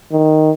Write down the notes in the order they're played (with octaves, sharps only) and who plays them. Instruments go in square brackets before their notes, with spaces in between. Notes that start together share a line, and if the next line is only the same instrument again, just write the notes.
[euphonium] D#3